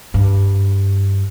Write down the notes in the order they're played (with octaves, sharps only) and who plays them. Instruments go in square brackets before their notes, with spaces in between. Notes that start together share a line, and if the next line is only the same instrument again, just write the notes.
[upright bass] G2